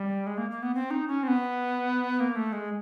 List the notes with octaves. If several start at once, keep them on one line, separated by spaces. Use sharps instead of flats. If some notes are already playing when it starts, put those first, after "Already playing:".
Already playing: G3
G#3
A#3
A#3
B3
C4
D#4
C#4
C4
B3
A#3
A3
G#3